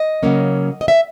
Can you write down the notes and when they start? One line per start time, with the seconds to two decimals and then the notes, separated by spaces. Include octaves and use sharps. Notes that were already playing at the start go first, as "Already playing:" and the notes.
Already playing: D#5
0.23 C#3 F#3 A#3 C#4
0.81 D#5
0.88 E5